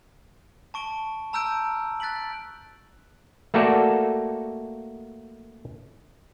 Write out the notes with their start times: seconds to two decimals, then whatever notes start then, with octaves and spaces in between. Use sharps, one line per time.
0.74 A5 C#6 D7 G7
1.33 A5 A#5 E6 F6 G6 D7
2.00 F#6 A6 B6 D7 F#7
3.54 A3 A#3 F#4 A4 D5